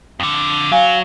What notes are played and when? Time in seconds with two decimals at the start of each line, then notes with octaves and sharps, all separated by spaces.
0.20 F2 D3
0.72 F#3 F5 G#5